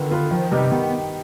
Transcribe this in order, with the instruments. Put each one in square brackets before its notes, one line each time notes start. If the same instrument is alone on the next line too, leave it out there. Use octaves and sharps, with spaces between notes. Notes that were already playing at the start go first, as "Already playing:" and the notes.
Already playing: [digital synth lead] D3 [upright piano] D#3 B3 F4 B4
[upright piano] B3 F4 B4
[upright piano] D#3 [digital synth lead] F3
[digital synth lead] C3 [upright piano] G3 B3 D#4 G4
[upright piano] D#3 [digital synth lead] B3